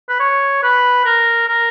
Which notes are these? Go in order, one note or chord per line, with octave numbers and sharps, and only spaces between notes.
B4
C#5
B4
A#4
A#4